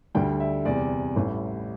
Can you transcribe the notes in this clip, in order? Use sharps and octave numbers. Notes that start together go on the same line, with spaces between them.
D2 D3 G3 G5
E5
E2 C3 G3 D5
A1 A2 E3 G3